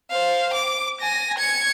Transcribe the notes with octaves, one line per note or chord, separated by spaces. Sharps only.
C5 F5
D6
G#5 A#6
G#6 C#7